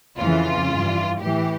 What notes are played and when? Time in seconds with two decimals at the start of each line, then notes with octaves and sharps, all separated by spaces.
0.17 F2 C#3 E3 F4
0.69 G2 E3
1.20 A2 E3 G4